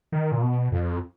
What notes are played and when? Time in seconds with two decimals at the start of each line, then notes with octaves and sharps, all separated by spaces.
0.12 D#3
0.32 A#2
0.41 B2
0.72 F2